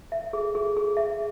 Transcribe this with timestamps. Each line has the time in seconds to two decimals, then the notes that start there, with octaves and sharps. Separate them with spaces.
0.12 E5
0.33 G#4
0.55 G#4
0.77 G#4
0.97 E5